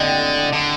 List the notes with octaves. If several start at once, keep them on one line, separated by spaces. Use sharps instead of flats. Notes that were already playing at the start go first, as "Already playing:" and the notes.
Already playing: D3 D#5 G5
D3